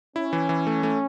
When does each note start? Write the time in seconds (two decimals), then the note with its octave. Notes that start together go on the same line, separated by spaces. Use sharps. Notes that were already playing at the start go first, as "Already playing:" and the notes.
0.16 C#4 E4
0.33 E3
0.49 E3
0.67 A3
0.83 A3